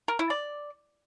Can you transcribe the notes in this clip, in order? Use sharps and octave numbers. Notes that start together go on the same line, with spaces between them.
A#4
E4
D5